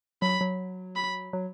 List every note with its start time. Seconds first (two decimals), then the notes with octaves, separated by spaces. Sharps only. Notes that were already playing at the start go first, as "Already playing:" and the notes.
0.22 F#3 B5
0.41 F#3
0.96 B5
1.33 F#3